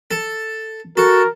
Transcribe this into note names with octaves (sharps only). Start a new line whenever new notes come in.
A4
F#4 A4 A#4